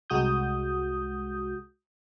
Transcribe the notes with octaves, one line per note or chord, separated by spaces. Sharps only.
C2 G#3 F#4 D#6 G6